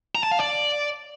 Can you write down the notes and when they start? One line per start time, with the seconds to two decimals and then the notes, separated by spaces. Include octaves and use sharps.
0.15 A#5
0.23 A5
0.32 F5
0.40 D5